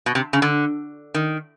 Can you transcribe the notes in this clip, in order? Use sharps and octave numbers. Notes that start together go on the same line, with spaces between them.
B2
C3
C#3
D3
D#3